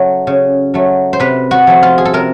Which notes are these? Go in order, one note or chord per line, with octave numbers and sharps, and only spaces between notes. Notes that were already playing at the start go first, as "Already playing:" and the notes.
Already playing: C#3 F#3 A3
C#3
F#3 A3
C5
C3 B4
F#4
F3 A3
F4
G#4
A4
C3 A#4